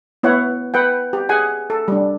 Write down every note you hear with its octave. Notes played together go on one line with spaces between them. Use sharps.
B3 E4 C#5 F#5
B4 F#5 G5
G4
G#4 F#5 G#5
A4
G3 D4